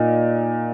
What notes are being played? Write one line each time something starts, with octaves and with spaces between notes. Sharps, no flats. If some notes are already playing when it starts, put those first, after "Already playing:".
Already playing: A#2 D#4